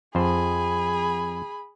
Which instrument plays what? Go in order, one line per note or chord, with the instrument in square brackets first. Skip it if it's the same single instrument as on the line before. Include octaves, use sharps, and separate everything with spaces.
[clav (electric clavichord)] F2 C5 [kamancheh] G#4 B5